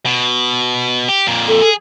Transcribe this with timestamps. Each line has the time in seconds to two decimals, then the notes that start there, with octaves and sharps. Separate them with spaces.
0.06 B2
1.09 G4
1.27 F2 A#2
1.47 A4
1.62 G#4